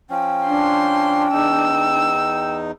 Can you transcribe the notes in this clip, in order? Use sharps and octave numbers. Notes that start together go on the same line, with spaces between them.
F3 C#4 G5
D4 C6
E2 D#4 E6